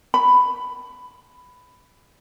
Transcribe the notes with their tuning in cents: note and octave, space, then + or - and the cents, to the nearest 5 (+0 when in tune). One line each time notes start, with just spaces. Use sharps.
B5 +10